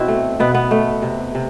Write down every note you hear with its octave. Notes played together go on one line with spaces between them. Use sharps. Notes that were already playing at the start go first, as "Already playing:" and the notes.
Already playing: B2 C4 E4 F#4
A3
B2 B3
B3
A3
C3
C3